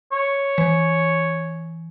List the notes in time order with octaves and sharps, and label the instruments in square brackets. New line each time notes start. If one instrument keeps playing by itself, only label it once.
[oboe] C#5
[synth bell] E3